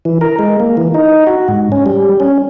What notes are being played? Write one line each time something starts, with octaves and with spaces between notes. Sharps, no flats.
E3
A#4
G#3
A#3
E3
D#4
F#4
G#2
C#4
G3
C#4